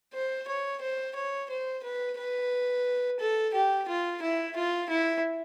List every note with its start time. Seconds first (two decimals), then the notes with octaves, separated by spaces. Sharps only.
0.13 C5
0.47 C#5
0.81 C5
1.15 C#5
1.49 C5
1.83 B4
2.18 B4
3.20 A4
3.54 G4
3.88 F4
4.22 E4
4.56 F4
4.90 E4